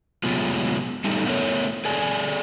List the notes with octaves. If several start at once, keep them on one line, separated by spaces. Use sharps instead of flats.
C3 F#3 G#3 A3 B3 F4
G3 A3 D#4 A4
A3 B3 A#4 C#5
G#4 A4 D5 G#5